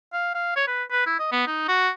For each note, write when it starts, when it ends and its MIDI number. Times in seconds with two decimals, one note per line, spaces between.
0.13 0.34 77
0.35 0.53 77
0.56 0.64 73
0.68 0.83 71
0.91 1.06 71
1.07 1.16 64
1.19 1.29 75
1.32 1.44 59
1.47 1.68 63
1.68 1.90 66